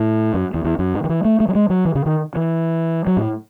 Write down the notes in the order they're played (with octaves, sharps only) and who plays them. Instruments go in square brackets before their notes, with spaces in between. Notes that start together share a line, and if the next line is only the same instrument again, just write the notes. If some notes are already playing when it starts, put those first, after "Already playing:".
Already playing: [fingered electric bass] A2
F#2
E2
E2
F#2
G#2
D#3
E3
A3
A3
F#3
G#3
F#3
E3
C#3
D#3
E3
F#3
A2